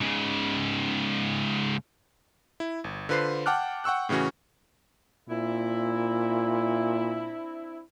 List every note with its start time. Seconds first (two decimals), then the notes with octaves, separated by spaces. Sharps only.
0.01 G#2 C#3
2.60 E4
2.84 G1
3.09 D3 F4 B4 C5 C7
3.46 F#5 G5 A5 D6 F6 F#6
3.84 F#5 G5 C#6 E6 F#6
4.09 A2 C#3 E3 C#4 F#4
5.29 A#2 C4 D4 E4